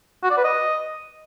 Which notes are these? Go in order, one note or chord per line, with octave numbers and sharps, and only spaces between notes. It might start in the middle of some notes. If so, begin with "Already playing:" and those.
F#4
D5
B4
D#5